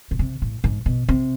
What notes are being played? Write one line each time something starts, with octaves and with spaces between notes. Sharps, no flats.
B2
C3
A2
G#2
B2
C3